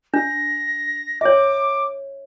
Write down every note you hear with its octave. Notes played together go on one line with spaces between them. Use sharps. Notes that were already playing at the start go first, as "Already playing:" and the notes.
D4 A#6
C#5 E5 D6